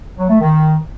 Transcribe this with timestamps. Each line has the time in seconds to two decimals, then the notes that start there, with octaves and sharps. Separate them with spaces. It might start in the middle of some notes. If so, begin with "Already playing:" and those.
0.18 F#3
0.29 A3
0.40 D#3